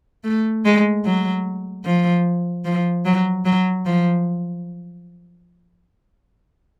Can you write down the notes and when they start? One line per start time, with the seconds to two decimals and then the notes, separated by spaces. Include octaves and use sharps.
0.24 A3
0.65 G#3
1.05 F#3
1.85 F3
2.65 F3
3.05 F#3
3.45 F#3
3.86 F3